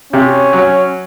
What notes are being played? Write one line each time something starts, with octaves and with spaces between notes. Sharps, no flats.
C3 C#4
F#3